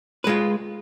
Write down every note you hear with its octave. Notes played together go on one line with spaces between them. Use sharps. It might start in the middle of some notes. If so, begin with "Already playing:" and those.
G#3 F4 B4